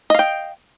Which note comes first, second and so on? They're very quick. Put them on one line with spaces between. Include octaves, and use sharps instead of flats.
D#5 F5 G5